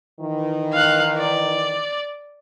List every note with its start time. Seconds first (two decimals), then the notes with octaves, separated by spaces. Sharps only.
0.20 D#3 E3
0.73 F5 F#6
1.18 D5